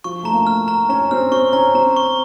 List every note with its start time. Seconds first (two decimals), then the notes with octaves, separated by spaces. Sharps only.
0.04 F3 C#6
0.23 A3 A#5
0.33 A#3
0.47 F6
0.68 A#5
0.89 C#4 A#5
1.11 C4 F6
1.32 C4 C#6
1.53 C#4 A#5
1.75 C4 A#5
1.96 C#6